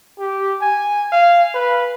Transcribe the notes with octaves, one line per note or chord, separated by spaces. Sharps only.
G4
G#5
F5
B4